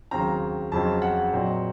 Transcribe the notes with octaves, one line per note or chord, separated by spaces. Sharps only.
D#2 C#3 F#3 C4 A#5
F2 C#3 F#3 C4 D#4 A5
F#5
A#2 F#3 C4 D#4